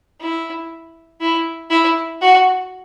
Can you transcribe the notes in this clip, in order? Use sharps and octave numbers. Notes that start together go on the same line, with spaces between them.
E4
E4
E4
F#4